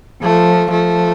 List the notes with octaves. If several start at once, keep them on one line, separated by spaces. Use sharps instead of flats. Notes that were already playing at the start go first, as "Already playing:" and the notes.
F3 A3
F3 A3